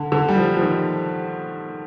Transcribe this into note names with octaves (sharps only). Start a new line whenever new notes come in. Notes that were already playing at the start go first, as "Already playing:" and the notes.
Already playing: D3
D3
G3
F3
F3
D#3